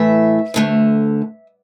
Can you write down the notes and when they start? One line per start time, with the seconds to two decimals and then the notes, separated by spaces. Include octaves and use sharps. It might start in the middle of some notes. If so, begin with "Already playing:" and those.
Already playing: A2 E3 A3 E5
0.54 D2 D3 A3